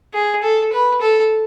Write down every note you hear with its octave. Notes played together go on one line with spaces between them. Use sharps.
G#4
A4
B4
A4